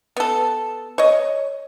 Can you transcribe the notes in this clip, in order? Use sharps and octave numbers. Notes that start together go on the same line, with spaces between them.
B3 A4
C#5 D#5